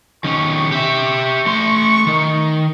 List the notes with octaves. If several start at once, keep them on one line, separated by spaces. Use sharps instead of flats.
D#3 C#4 C#6
G4 E5
A3 C6
D#3